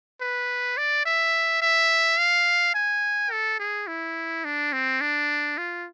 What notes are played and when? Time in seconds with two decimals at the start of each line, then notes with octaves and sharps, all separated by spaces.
0.21 B4
0.77 D5
1.06 E5
1.62 E5
2.18 F5
2.75 G#5
3.31 A4
3.60 G#4
3.87 E4
4.45 D4
4.73 C4
5.01 D4
5.58 F4